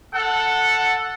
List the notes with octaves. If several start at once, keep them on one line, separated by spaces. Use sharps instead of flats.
A4 F#5